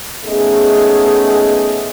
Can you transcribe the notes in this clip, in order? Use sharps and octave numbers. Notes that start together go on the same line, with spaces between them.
A3 B3 C#4 D#4 G#4